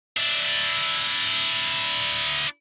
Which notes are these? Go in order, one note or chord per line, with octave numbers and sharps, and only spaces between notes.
D4 E4